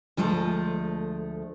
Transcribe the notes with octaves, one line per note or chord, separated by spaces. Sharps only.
D2 F3 G#3 A3